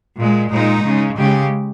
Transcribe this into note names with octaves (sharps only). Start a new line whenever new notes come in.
A#2 G#3
A#2 G#3 D#4
C#3 G#3
C#3 G#3 G4